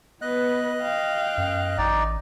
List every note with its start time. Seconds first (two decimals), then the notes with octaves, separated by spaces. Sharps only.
0.22 B3 B4 D#5 F#6
0.82 F5 G5
1.38 F#2
1.78 A1 D#4 D5